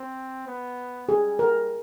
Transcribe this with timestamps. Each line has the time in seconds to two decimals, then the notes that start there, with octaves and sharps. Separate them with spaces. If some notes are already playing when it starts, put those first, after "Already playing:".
Already playing: C4
0.47 B3
1.08 G3 G#4
1.39 A#4